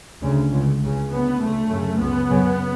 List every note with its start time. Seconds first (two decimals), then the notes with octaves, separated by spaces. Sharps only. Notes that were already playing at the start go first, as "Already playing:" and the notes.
0.21 D2 C#3
0.51 C#2 C#3
0.80 C#2 C#3
1.09 D2 C#3 B3
1.39 D2 C#3 A3
1.68 F#2 C#3
1.98 C#2 C#3 B3
2.28 F#2 C#3